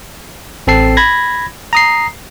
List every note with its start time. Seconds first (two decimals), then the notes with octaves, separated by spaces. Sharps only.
0.67 A1 C4 A4 A5 C7
0.97 B5 G#6 A#6
1.73 A#5 D#6 C7